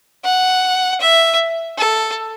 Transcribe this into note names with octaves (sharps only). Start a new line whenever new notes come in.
F#5
E5
A4